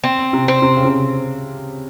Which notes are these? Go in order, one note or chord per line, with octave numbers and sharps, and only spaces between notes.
C4
C3
C4
C3
C#3
C3